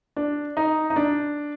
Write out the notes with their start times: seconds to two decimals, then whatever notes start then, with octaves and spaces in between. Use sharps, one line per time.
0.16 D4
0.57 D#4
0.90 D#4
0.96 D4